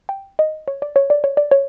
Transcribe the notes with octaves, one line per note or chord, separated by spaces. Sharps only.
G5
D#5
C#5
D5
C#5
D5
C#5
D5
C#5